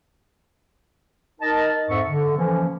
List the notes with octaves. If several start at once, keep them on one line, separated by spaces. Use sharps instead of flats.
D#4 A#4 D#5 A5
F2 G#2 E5 C#6
D3
E3 F3 A#3 C#4